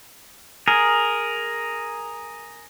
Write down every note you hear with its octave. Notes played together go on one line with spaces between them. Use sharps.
G#4 A#4